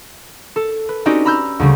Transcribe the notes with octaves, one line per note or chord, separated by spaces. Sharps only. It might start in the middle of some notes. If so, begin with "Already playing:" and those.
A4
B4
C4 C#4 D#4 F#4 G4 D5
A#5 B5 E6 F6 G6
D2 C#3 G3